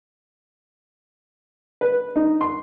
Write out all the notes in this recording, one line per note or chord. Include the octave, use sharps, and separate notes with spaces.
B4
D#4
C6